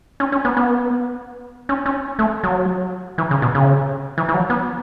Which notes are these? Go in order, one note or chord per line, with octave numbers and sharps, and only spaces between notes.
C#4
C#4
B3
B3
C#4
C#4
A3
F#3
E3
C#3
B2
C#3
E3
E3
F#3
B3